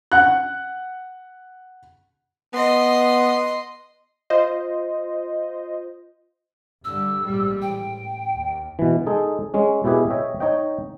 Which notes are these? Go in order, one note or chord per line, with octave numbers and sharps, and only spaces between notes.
F#5 F#6
B3 D#5 C6
F4 C5 D#5
G2 D3 G3 E6
A#1 G#2 G3
A1 G5
D#2
B2 E3
G#3 D#4 G#4 A4
G#3 C#4
B2 E4 G4 G#4 B4
C#5 D#5 E5 G5
D#4 C#5 D#5 G5